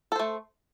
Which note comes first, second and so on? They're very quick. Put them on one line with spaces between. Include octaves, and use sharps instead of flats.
A4 C5 A3